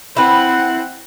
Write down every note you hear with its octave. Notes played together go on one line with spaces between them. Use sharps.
C4 E4 B4 F#5